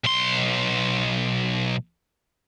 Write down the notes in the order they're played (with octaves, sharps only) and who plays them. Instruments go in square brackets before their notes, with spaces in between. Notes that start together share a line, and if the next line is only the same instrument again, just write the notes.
[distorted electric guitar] B1 C6